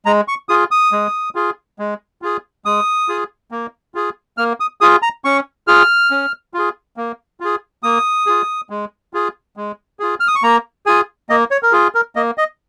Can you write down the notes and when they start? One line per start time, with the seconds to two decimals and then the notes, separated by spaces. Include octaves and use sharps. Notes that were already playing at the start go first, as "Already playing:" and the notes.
0.06 G#3 A#5
0.28 C#6
0.49 F4 G#4 D#6
0.71 D#6
0.92 G#3
1.35 F4 G#4
1.79 G#3
2.22 F4 G#4
2.65 G#3 D#6
3.08 F4 G#4
3.51 A#3
3.95 F4 G#4
4.38 A#3 F6
4.60 D#6
4.81 F4 G#4 D#6
5.02 A#5
5.25 C#4 C#6
5.67 F4 G#4 F6
6.11 C#4
6.54 F4 G#4
6.97 A#3
7.40 F4 G#4
7.83 A#3 D#6
8.27 F4 G#4
8.70 G#3
9.13 F4 G#4
9.57 G#3
10.00 F4 G#4
10.20 F6
10.27 D#6
10.35 C#6
10.43 A#3 A#5
10.86 F4 G#4 G#5
11.30 A#3 D#5
11.51 C#5
11.63 A#4
11.72 F4 G#4
11.95 A#4
12.16 A#3 D#5
12.38 D#5